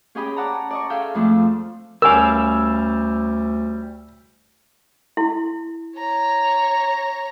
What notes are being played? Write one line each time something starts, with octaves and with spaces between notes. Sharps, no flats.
C#4 G4 G#4 D#5 G5 B5
D5 F#5 A5 A#5
D5 D#5 C#6
G#4 A4 E5 F5 G5
F2 F3 G#3 A3 D4
D2 G3 C#4 A#4 F5 G#5 E6
E4
C#5 A#5